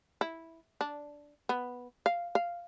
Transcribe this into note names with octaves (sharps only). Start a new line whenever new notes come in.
E4
D4
B3
F5
F5